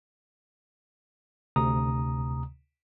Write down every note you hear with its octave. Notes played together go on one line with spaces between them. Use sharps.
D2 C3 A#5 D#6